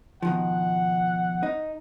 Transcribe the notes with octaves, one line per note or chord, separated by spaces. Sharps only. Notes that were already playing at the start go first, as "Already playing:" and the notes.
B2 D#3 F3 F#5
D#4